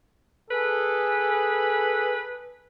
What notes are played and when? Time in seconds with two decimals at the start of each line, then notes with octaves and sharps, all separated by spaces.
0.51 G#4 A4 B4